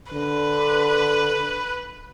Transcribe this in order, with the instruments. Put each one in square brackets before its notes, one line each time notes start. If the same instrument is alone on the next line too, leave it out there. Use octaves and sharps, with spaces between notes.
[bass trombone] D3 [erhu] B4